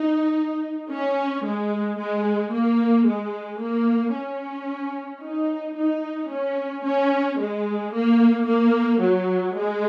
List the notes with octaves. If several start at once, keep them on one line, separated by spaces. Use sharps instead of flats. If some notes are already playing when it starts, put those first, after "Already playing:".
Already playing: D#4
C#4
G#3
G#3
A#3
G#3
A#3
C#4
D#4
D#4
C#4
C#4
G#3
A#3
A#3
F#3
G#3